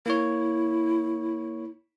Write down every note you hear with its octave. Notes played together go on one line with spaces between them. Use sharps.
A#3 E4 C#5